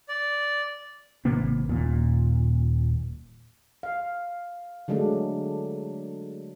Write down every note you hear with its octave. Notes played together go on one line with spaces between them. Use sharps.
D5
G#1 C3 A#3 B3
D#1 A#2
F5
D3 F#3 G#3 A3 D4